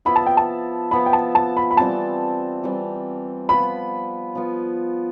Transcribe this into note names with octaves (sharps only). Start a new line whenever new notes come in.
F3 B3 E4 B5
A5
G5
A5
F3 B3 E4 B5
G5
A5
A5
B5
B5
E3 G3 C4 A5
E3 G3 C4
F3 B3 F4 B5
F3 B3 F4